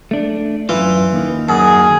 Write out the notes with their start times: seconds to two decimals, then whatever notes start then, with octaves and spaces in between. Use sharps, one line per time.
0.11 A3 D4
0.69 F#2 E3 F4
1.13 D#2 D#3
1.49 F#2 G#4